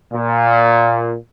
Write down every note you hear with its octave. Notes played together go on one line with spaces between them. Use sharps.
A#2